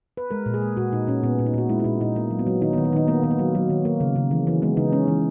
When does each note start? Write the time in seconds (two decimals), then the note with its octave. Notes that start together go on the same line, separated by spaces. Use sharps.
0.17 B4
0.31 G#3 A#4
0.46 A#2
0.54 G#4
0.62 G#3
0.77 A#2 F#4
0.92 A#2 D#4
1.07 A#2 C#4
1.23 A#2 B3
1.39 A#2
1.46 D#4
1.54 A#2 F#4
1.69 G#3 E4
1.80 E4
1.84 A#2 D#4
2.01 A#2 D#4
2.16 A#3
2.31 F#3
2.39 B3
2.47 F#3
2.61 D#3 D#4
2.73 B3
2.78 D#3
2.84 B3
2.93 D#3 D#4
3.08 A#3 B3
3.23 D#3 B3
3.31 A#3
3.39 F#3
3.55 F#3
3.70 D#3
3.85 A#3
4.00 C#3
4.16 C#3
4.31 E3
4.47 E3 C#4
4.62 G#3 B3
4.77 C#3 D#4
4.92 G#3 C#4
5.08 E3